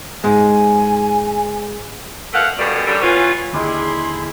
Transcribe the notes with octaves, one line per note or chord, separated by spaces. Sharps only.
G#2 G#3 G#5
B2 A3 A#4 F5 F#5
F#2 B2 D3 G3
F#2 D3 G3
E3 B3 C#4 F4
D#2 D3 G3 G#3 E4 G#4 C6